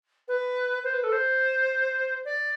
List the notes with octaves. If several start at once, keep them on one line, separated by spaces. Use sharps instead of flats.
B4
C5
B4
A4
C5
D5